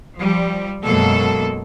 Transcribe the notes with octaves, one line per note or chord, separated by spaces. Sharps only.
F3 G3
F#2 B2 G#3 A#3 A4